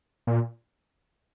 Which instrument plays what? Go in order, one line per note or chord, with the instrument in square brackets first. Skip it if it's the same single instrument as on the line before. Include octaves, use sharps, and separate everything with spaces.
[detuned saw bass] A#2